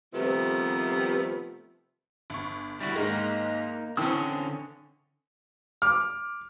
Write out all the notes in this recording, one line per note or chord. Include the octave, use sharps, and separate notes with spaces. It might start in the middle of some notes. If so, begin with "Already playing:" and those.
C3 D#3 F3 G3 A3 B3
G1 C#6
G3 E4 F#4
G#2 G#3 A#3 D#4
D3 E3 C4 C#4 D#6
D6 F6